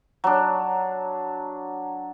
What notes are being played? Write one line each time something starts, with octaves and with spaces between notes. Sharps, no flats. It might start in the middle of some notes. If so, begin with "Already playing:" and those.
F#3 D4